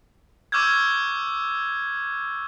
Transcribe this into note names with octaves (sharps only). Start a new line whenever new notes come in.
C#6 D6 E6 F6 G6 G#6